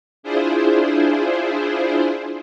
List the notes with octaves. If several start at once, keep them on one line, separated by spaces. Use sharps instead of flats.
D4 E4 F4 G#4 C5